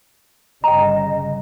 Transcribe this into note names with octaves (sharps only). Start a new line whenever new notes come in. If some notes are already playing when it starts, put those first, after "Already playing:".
G1 C#3 G3 D#5 G5 A#5